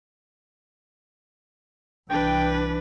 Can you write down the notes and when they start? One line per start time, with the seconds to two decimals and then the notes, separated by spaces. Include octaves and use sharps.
2.10 C2 E3 D4 B4 G5